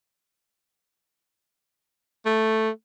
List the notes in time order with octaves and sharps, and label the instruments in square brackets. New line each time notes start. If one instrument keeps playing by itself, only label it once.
[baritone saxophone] A3